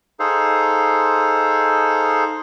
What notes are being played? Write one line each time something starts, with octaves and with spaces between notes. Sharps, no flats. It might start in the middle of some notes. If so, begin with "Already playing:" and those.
D#4 G#4 A4 C5 F5